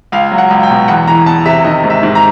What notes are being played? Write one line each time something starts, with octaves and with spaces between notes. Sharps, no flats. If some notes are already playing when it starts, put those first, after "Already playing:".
C#2 F5
F#3
F#5
C#2
G5
B2
E2 F#5
E3 A#5
E2 A5
C3 E5
D#3 D#5
G#2
E5
G#2
A#5